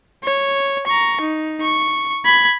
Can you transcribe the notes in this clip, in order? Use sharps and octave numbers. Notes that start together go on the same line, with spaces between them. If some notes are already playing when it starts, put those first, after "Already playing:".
C#5
A#5 C#6
D#4
C#6
B5 G#6